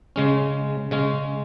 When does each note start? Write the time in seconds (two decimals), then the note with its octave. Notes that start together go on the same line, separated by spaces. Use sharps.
0.16 C#3 G#3 C#4
0.91 C#3 G#3 C#4